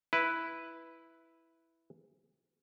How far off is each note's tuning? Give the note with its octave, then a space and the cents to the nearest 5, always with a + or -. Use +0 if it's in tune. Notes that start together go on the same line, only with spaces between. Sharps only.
E4 +0 B4 +0